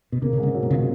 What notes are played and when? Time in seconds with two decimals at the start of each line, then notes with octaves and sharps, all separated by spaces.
0.12 B2
0.22 C#3 A#3
0.33 C#3
0.38 G#2
0.43 C#3
0.54 F#3
0.63 B2
0.70 C#3 F4
0.79 B2